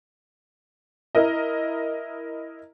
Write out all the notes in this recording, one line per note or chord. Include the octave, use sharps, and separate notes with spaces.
E4 A#4 D#5